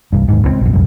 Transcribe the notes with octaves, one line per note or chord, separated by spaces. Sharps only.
C2 G2
D#2 G#2
C#2 D3 C4
A#1 F#2
F1 C2 F#2